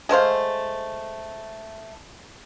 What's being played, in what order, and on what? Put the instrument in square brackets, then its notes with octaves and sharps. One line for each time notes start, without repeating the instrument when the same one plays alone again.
[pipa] G#3 A3 C5 F5